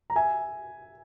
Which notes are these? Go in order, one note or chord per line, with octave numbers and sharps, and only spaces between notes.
A#5
E5 G#5